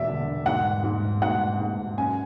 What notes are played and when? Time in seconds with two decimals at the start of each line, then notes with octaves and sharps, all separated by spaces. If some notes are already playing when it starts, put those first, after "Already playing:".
Already playing: E1 E2 D5 E5
0.08 D3
0.46 G#2 F#5
0.84 G#2
1.22 G#2 F#5
1.60 G#2
1.98 F#2 G#5